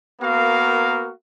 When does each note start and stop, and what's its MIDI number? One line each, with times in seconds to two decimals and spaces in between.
0.21 1.11 58
0.21 1.11 59
0.21 1.11 66
0.21 1.11 70
0.21 1.11 77